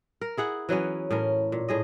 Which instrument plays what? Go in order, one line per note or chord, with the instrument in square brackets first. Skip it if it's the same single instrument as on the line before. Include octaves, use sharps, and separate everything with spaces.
[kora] A#4
E4 G#4 F#5
E3 F#3 B3 C#4
A2 C#4 A#4
A#2
A2 G#4 D#5